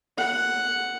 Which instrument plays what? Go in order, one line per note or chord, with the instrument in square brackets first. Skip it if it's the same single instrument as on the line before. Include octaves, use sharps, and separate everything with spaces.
[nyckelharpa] F#5